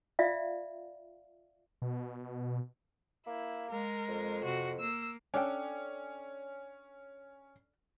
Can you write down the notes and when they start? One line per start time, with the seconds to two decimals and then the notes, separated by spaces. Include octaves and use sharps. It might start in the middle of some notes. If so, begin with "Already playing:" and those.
0.19 F4 D5 E5 F5
1.82 B2
3.27 A#3 E4
3.71 G#3 A#4
4.08 F2
4.45 C3 F#4
4.80 A#3 E6
5.34 C#4 D4 A4 G5